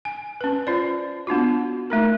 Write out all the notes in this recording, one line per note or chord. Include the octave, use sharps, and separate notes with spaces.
G#5
C#4 B4
F4 C5 D5
B3 D4 F4 F#4
A3 D#4 A#4